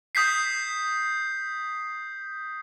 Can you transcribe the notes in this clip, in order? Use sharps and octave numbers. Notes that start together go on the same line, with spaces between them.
D#6 G6 B6 C7